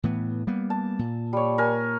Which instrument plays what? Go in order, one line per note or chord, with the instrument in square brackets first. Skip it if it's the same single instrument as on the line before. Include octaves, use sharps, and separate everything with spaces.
[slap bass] A2 E3 B3
G3 A#3 B3
[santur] A5
[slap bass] A#2
[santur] G3 C#5
A#4 G#5